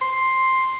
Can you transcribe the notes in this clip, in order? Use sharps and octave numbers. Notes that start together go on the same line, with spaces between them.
C6